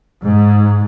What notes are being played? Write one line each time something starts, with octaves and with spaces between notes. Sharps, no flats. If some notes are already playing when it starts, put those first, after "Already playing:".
G#2